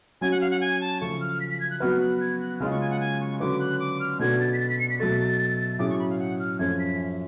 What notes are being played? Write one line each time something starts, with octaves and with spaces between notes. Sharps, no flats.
F#3 C#4 F#4 G#5
F#5
F5
F#5
G#5
A5
C#3 F3 A3 C#6
F6
B6
B6
G#6
F#6
F#3 B3 F#4 B4 F6
F#6
G#6
F#6
C#3 G#3 C#4 F4 F6
C#6
G#5
F#5
G#5
C#6
D3 F#3 C#4 F#4 B4 D6
F#6
D6
F6
B2 A3 D4 F#4 B4 G#6
A6
B6
A6
B6
C#7
B6
B2 F#3 A3 A6
A2 F#3 C#4 G#4 D6
C#6
B5
F5
F#5
F6
F#2 F3 A3 C#4 G#6
B6